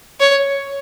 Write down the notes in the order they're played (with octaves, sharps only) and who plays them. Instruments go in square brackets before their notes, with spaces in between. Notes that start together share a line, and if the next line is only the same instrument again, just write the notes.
[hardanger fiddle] C#5